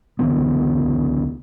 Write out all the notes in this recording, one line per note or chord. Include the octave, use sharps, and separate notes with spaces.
C#2 D3 E3 B3